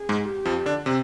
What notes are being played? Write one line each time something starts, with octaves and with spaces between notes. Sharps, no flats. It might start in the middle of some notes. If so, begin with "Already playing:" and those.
Already playing: G#4
G#2 G#3
G4
F2 F3
D3 D4
C3 C4